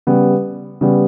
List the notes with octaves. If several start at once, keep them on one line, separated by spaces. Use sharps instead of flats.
C#3 G3 B3
C#3 G3 B3